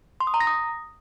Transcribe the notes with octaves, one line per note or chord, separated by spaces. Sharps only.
C6
D#6
A#5
A#6
D#6